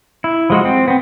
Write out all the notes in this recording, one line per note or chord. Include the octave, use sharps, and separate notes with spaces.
E4
F3 G#3 F#4
C4
B3 C4